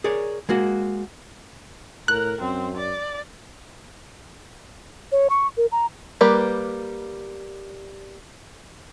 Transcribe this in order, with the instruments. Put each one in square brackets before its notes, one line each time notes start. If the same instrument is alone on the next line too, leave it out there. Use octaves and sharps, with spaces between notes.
[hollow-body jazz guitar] G#4 A#4 C#5 D5
G#3 A#3 F#4
[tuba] A2 [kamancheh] A#4 [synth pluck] F#6
[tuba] F#2 [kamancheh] C4
[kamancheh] D5
[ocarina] C#5
C#6
A#4
A#5
[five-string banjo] G3 A#3 G4 B4